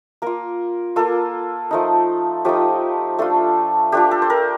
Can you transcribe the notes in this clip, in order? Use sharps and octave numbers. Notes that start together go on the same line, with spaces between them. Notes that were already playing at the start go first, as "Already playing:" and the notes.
A#3 F4 A#4
A#3 F4 A4
F3 A3 D#4
F3 A3 D#4 G4
A3 D4 F4 A4
A3 D4 F4 G4
A4
C5
A#4